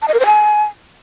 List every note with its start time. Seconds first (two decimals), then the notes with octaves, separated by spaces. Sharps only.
0.02 A5
0.08 D#5
0.14 A#4
0.20 C5
0.26 G#5